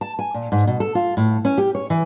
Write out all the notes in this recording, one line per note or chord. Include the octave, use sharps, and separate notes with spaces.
A5
G#5
A#2
G#2
B2
A4
F4
A2
C#4
G4
C#5
E3